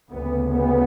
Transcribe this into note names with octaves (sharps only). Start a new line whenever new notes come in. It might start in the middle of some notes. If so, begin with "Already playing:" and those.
D2 C#3 B3
B3